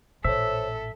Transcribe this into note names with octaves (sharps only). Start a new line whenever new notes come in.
A1 A#2 A4 C5 C#5 E5